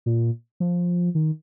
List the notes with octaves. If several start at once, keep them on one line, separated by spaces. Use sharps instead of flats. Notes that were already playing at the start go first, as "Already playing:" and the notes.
A#2
F3
D#3